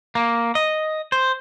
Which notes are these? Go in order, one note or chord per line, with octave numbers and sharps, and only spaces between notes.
A#3
D#5
C5